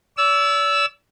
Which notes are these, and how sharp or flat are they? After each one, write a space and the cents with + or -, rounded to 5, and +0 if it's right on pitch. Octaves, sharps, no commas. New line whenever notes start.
D5 -40 E6 +0